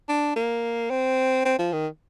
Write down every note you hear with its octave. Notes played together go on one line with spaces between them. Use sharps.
D4
A#3
C4
C4
F3
D#3